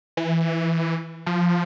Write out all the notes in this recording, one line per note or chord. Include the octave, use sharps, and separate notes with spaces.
E3
F3